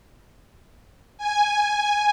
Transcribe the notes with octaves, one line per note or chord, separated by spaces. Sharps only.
G#5